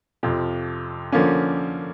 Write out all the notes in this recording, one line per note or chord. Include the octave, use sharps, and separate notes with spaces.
F2 C3 F3
D3 F3 A#3 C#4